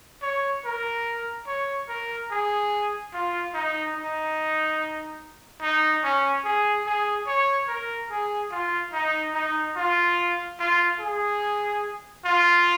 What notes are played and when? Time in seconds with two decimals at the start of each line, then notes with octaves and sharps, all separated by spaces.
0.23 C#5
0.65 A#4
1.47 C#5
1.89 A#4
2.31 G#4
3.14 F4
3.54 D#4
3.96 D#4
5.62 D#4
6.04 C#4
6.45 G#4
6.86 G#4
7.27 C#5
7.68 A#4
8.11 G#4
8.51 F4
8.93 D#4
9.35 D#4
9.77 F4
10.59 F4
11.00 G#4
12.25 F4